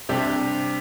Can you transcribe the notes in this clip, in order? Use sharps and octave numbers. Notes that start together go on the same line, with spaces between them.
C3 G3 D4 G4